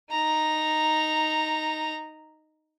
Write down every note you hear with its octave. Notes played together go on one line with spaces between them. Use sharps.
D#4 A#5